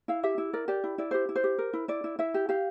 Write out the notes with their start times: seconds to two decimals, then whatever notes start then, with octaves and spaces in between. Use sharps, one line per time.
0.08 E4 F5
0.23 G4 E5
0.38 E4
0.53 A#4 D5
0.68 G4 D5
0.84 E4
0.98 E4 D5
1.11 G4 C5
1.29 E4
1.36 C5
1.44 G4
1.58 A#4
1.73 E4
1.88 E4 D5
2.04 E4
2.19 E4 E5
2.34 G4
2.49 G4 F5